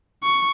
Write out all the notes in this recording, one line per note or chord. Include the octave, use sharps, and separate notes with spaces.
C#6